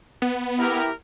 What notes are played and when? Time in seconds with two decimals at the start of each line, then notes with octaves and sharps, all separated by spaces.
0.22 B3
0.59 E4 G4 A#4